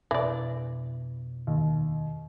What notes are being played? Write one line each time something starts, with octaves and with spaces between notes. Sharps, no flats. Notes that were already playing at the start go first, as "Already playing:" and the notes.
F2 B2 E3 D4 D5
D#2